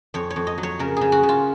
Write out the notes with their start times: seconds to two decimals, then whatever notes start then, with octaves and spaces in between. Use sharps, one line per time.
0.14 F2 C#5
0.30 C#5
0.36 F2
0.47 D#5
0.58 F#3
0.63 C#5
0.79 C#3 A#4
0.96 C#3 G#4
1.12 F#4
1.23 C#3
1.29 F4